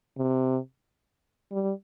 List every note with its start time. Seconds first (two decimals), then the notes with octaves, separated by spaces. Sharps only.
0.18 C3
1.52 G3